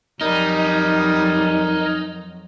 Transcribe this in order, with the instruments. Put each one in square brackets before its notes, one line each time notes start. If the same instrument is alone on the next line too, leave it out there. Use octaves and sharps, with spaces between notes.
[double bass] F2 F#3 [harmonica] G3 [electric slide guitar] D#4 [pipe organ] A#4 D#5 G#5